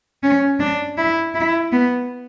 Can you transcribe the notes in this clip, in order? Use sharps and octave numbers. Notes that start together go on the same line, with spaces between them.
C#4
D4
E4
E4
B3